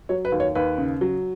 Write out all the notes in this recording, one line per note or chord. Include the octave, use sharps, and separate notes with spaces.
F#3 C#5
B4
D#2
C#5
D#2 B4
C#3
F#3